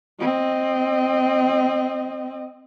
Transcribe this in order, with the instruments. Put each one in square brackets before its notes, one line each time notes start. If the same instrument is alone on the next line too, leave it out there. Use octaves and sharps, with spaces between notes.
[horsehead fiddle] C4 D#5